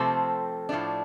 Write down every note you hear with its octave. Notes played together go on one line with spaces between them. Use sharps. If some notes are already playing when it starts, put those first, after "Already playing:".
Already playing: C3 F3 A3 C4 A4 C5
A2 F3 A3 D4